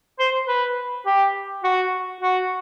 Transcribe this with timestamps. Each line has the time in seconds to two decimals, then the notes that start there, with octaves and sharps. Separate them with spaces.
0.19 C5
0.48 B4
1.06 G4
1.64 F#4
2.21 F#4